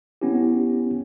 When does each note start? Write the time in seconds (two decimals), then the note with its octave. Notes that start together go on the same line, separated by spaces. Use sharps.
0.22 B3 C#4 E4 G4